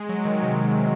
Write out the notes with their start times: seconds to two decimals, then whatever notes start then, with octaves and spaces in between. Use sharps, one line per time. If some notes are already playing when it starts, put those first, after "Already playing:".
Already playing: G#3
0.09 F#3
0.25 D#3
0.42 C3